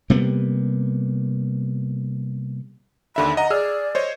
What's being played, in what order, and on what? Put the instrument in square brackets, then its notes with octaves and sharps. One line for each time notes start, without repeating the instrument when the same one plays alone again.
[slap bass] C3 G3 A#3 B3
[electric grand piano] D#2 D3 E5 [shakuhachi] B5
[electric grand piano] D#5 F#5 [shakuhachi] A#5
[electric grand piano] G#4 E6 F6 [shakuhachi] D5
[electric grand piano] C5 C#5 D#5